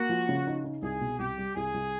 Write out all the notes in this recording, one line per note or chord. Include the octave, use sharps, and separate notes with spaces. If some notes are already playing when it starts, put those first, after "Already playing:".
Already playing: A#3 F#4
F3
C#3
D#4
D#4
C2 G#4
B2
C2 G4
G3
C2 G#4
C2